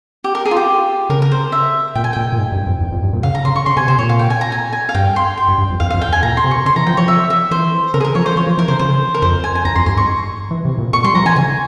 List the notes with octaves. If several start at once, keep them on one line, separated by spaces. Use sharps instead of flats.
G4
A#4
G#4
F4
G4
C#3 A#4
A#4
C5
E5
A#2 G5
G#5
A#2 G5
A#2
G#2
G2
F2
E2
F2
G2
A#2
C#3 F5
A#5
C#3 C6
C#6
C#3 C6
C3 G#5
C3 C5
A#2 C#5
F5
G5
G#5
A#5
G#5
G#5
F5
G2 G5
C6
G5
G2
G2
F2
E2 F5
F2 F5
G5
E2
G#5
A#2 A#5
C6
C3
C#6
C#3 C6
E3 A#5
F3 G5
F3 C#5
E5
E5
E3 C5
C#3 A#4
G#4
A#4
F3 C#5
C5
F3 C#5
F3
E3 A#4
C#3 C5
C#3 C5
A#4
F2 C5
G#5
G#5
E2 A#5
F2 C6
G2 C6
G#2 C#6
E3
C3
A#2
A#2 C#6
G3 C6
F3 A#5
E3 G#5
C#3 G#5